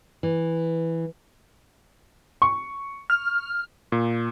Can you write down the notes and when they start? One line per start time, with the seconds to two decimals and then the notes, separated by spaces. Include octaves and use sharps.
0.23 E3
2.42 C#6
3.10 F6
3.92 A#2